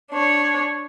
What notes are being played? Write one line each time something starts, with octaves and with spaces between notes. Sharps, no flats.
D4 C#5